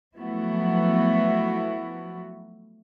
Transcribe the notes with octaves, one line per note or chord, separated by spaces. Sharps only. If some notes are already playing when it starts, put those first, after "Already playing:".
F3 F#3 A3 B3 E4 F#4